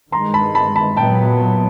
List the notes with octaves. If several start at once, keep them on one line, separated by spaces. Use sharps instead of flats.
G2 D#3 G#3 A#5 C6
A5 B5
A5 B5
A5 B5
A#2 F#3 B3 G5 A5